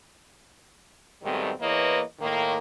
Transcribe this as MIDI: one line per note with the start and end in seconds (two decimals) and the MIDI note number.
1.23 1.51 44
1.23 1.51 47
1.23 1.51 51
1.23 1.51 55
1.23 1.51 57
1.23 1.51 60
1.60 2.01 40
1.60 2.01 52
1.60 2.01 58
1.60 2.01 71
1.60 2.01 73
1.60 2.01 75
2.20 2.58 45
2.20 2.58 51
2.20 2.58 58